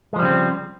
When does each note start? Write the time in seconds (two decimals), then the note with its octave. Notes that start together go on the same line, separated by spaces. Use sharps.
0.13 G#3
0.16 F3
0.19 G3
0.22 C#3
0.25 C4